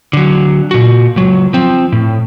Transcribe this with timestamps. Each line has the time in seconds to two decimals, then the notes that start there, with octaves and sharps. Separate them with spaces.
0.13 D3 F#3
0.71 A#2 F#4
1.16 C#2 F#3
1.53 F3 C4
1.92 A2